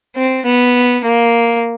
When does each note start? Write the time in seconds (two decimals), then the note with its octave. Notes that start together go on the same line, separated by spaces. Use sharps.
0.16 C4
0.45 B3
1.05 A#3